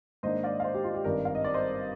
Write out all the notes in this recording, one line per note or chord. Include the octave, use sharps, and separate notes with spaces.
G#2 D#3 A#3 D4 C5 D#5
D5 F5
F5
C5 D#5
G4
F4
G4
G#1 G2 D#3 A#4 D5
F5
D#5
D5
C5 D#5